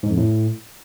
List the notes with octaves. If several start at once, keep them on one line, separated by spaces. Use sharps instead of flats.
G#2
F2
A2